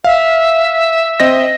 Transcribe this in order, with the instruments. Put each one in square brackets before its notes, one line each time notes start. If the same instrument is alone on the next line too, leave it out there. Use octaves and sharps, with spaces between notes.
[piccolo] E5 [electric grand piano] F5
[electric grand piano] C4 D#5 A#6